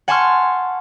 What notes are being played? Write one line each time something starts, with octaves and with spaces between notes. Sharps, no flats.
F#5 G#5 A5 C6 C#6 F6